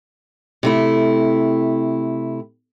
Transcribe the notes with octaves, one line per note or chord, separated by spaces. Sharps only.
C3 A3 E4